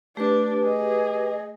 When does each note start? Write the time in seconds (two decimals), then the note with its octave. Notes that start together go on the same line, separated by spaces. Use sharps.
0.17 A3 D4 G4 B4 D6
0.65 G#4 D#5